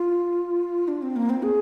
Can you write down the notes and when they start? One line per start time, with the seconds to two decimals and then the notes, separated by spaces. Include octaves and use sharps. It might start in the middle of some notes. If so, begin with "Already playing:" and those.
Already playing: F4
0.88 D4
1.02 C4
1.16 A#3
1.30 C4
1.43 G#4